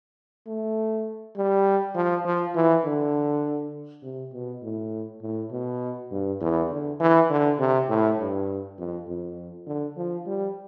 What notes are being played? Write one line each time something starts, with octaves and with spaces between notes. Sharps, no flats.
A3
G3
F3
F3
E3
D3
C3
B2
A2
A2
B2
G2
E2
D3
E3
D3
C3
A2
G2
F2
F2
D3
F3
G3